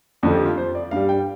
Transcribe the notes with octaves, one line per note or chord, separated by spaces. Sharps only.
F2 D3 F3 A3 D4
G4
F4
C5
D5
G2 G3 F5
G5